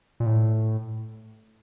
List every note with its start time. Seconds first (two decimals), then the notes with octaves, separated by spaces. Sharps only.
0.20 A#2
0.26 A2